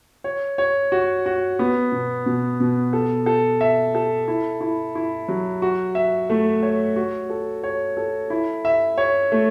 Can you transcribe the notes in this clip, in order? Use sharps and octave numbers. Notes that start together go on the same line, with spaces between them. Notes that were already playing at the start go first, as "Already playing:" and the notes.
C#5
C#5
F#4
F#4
B3
B2
B2
B2
A4
A4
E5
A4
E4
E4
E4
F#3
F#4
E5
A3
C#5
F#4
A4
C#5
A4
E4
E5
C#5
A3